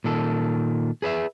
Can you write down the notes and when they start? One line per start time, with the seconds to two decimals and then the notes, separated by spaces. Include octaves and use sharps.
0.04 A#2 D#3 A4
1.02 G#4 B4 D#5 E5